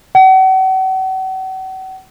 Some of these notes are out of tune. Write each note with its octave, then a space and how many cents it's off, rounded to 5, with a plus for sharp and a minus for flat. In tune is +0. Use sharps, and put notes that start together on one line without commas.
F#5 +40